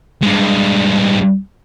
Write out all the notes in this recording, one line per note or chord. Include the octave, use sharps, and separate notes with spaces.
G2 G#3